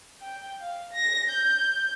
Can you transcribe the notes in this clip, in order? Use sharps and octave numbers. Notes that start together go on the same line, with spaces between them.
G5
F5
A#6
G6